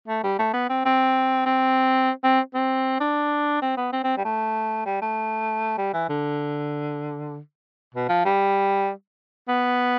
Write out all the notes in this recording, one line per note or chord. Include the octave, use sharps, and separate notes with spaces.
A3
G3
A3
B3
C4
C4
C4
C4
C4
D4
C4
B3
C4
C4
G3
A3
G3
A3
G3
E3
D3
B2
F3
G3
B3